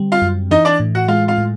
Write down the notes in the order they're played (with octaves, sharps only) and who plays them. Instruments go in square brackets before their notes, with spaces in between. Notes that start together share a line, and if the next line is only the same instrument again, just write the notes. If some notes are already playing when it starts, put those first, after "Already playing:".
Already playing: [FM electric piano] D3 G3 C4
[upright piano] F4 F5
[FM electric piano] F#2
[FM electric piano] E3 [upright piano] D#4 D#5
[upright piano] D4 D5
[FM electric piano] A2
[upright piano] F#4 F#5
[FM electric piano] G#3 [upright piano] F4 F5
[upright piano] F4 F5
[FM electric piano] A2